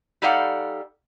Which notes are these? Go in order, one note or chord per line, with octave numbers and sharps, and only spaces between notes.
G3 D#4 A4 D5 F5 F#5